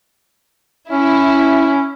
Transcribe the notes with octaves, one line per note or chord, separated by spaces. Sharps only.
C#4 E4